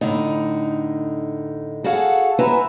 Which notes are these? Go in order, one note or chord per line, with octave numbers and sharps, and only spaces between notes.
A2 D3 D#4
F#4 G#4 A4 F5 F#5
E4 F#4 B4 C5 G#5 A#5